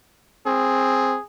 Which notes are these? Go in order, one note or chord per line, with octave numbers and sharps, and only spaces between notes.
C4 G#4